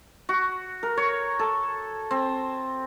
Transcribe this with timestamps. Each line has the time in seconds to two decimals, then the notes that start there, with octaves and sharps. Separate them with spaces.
0.29 F#4
0.83 A#4
0.97 C#5
1.39 A4
2.11 C4